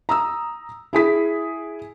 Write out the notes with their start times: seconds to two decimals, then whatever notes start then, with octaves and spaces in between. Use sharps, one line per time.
0.09 A#5 D#6 E6
0.93 E4 G#4 B6